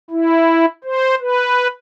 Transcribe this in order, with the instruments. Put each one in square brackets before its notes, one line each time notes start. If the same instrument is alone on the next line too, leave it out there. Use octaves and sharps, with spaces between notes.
[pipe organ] E4
C5
B4